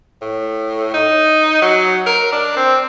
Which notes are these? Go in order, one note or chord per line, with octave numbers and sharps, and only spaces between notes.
A2
D#4
F#3
A#4
D4
C4